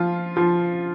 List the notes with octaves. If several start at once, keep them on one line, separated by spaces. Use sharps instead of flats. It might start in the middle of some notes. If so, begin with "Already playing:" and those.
Already playing: F3 F4
F3 F4